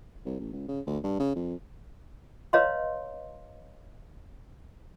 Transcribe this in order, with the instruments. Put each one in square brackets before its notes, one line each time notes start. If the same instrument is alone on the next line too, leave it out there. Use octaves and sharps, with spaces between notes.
[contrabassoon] C2
A1
C#2
C#3
D2
G2
C#3
F2
[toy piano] B4 C#5 D#5 F5 A#5 C6